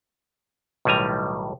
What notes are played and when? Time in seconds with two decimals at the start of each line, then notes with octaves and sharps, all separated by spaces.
0.85 B1 A2 D#3 G3 G#5 A#5